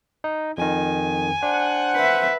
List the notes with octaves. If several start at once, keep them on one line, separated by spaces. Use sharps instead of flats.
D#4
F2 D#3 G#5
D4 C5 F#5
B4 E5